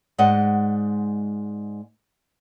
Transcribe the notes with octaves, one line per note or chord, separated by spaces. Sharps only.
G#2 G#3 D5 D#5 F#5